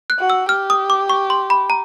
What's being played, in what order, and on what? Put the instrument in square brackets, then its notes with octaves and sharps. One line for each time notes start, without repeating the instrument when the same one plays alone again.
[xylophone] F#6
[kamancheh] F#4
[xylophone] E6
[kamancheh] G4 [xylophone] F6
[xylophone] D#6
D6
C#6
C6
B5
A#5